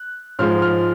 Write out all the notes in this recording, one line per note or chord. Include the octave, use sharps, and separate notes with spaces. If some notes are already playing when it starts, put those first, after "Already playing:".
Already playing: F#6
G#2 F3 G#3 F6
F6